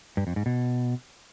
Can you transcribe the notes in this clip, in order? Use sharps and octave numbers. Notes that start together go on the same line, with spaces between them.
G2
F2
G#2
B2